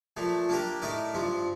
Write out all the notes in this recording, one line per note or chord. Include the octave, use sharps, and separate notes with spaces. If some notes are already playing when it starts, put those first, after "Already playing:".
A#2 F3 A3
A#3 D4 G4 A#4
A2 A3 D#4 A#4 D5
G2 F3 C4